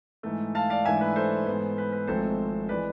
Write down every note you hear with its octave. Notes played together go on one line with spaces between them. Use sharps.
G#2 E3 A3
F5 A5
D5 F5
G#2 E3 A3 D4 E5 G#5
B4
A4 C5
G#2 E3 B3
B4
B4
G#1 G#2 F3 A3 C4 A4 C5
E3 G#3 B4 D5